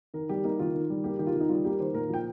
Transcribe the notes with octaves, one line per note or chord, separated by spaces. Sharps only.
D#3 A#4
G3 G4
A#3 D#4
D#3 F4
D#3
G3
A#3 G4
D#3 G4
F4
D#3
D#4
G3 F4
A#3 G4
D#3 C5
A#2 A#4
F3 G5